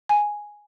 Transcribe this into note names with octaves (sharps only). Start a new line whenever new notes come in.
G#5